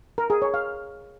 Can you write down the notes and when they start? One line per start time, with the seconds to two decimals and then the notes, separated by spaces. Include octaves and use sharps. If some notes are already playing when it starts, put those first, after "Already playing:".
0.18 A#4
0.30 G#4
0.42 C#5
0.54 F5